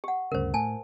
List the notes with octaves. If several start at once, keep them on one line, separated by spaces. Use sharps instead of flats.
G4 F#5
D2 G2 C#3 A#4 C5
A2 G#5 A5